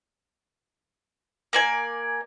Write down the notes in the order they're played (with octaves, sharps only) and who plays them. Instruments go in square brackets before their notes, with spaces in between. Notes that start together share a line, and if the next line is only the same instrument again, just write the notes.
[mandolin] A#3 D5 G#5